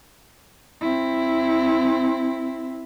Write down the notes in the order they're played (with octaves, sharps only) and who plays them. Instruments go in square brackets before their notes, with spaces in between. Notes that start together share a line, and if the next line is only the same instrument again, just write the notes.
[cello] C4 E4